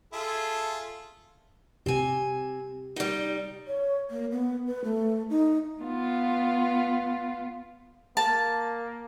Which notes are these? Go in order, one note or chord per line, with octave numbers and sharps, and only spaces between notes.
F4 G#4 A4 E5
C3 C4 G4 G#5
G3 D#4
C#5
A#3
B3
B4
A3
D#4
B3 F4
A#3 A5